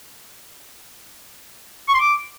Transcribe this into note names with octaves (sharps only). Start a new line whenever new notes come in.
C#6
C6
D6